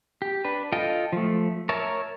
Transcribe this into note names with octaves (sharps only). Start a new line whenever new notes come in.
G4
D4 B4
F4 A4 D#5 G5
F3 A3
A#4 C#5 E5 A5